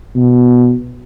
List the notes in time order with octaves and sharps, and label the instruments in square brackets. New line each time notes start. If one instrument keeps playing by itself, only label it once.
[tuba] B2